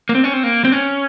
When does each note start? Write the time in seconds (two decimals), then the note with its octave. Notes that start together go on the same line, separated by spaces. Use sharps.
0.09 A#3
0.15 C4
0.24 C#4
0.33 C4
0.43 A#3
0.65 C4
0.72 C#4